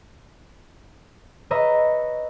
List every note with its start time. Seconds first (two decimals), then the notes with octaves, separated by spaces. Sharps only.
1.51 B4 C#5 D#5 E5 A#5